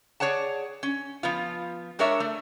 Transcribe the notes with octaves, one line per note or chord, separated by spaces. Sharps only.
G#4 C#5 D5 F#5 A5
C#4
F3 B3 F4
G#3 D4 A#4 C#5 E5
A3